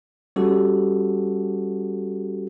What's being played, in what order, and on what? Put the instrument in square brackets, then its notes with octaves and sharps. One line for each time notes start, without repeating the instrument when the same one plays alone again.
[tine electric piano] G3 C#4 F#4 G4 A4